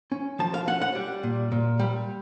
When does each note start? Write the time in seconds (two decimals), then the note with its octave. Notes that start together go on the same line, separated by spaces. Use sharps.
0.12 C#4
0.39 F3 A5
0.54 F5
0.67 C#4 F#5
0.82 F#5
0.95 G3
1.23 A#2
1.52 A#2
1.79 G3